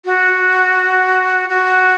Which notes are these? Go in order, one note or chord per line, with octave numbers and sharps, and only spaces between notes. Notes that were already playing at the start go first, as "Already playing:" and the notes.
F#4
F#4